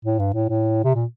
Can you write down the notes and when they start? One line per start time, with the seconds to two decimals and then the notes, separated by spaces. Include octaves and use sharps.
0.05 A2
0.19 G2
0.34 A2
0.49 A2
0.84 C3
0.94 A#2